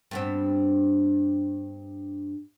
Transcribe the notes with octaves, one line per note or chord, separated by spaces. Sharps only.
G2 B3 C4